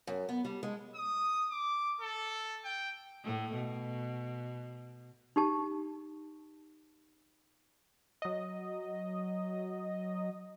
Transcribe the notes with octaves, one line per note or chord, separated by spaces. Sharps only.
F#2
B3
G3
G#3
D#6
D6
A4
G5
A2 A3
B2
D#4 G4 A5
F#3 D#5